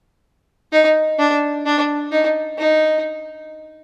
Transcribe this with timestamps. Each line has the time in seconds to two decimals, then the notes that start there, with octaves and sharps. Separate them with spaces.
0.72 D#4
1.19 D4
1.66 D4
2.11 D#4
2.58 D#4